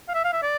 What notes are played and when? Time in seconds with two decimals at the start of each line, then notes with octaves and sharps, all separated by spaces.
0.09 F5
0.14 E5
0.24 F5
0.33 E5
0.42 D5